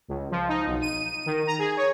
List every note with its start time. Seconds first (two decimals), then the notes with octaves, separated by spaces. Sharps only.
0.08 C#2
0.31 F3
0.48 D#4
0.67 B1
0.82 D#7
1.26 D#3
1.47 A#5
1.59 G#4
1.77 C#5